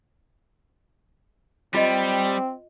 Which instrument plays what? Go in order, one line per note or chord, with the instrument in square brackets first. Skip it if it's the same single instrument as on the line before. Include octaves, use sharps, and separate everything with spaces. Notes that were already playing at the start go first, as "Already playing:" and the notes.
[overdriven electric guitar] G3 [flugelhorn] C4 [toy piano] F4 D#5